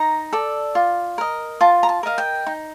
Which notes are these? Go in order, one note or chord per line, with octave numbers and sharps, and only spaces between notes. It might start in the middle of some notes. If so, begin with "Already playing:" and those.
Already playing: D#4 A#5
A4 D5
F4
A#4 D#5
F4 A5
A#5
A5
A#4 D#5 F5
G5
D#4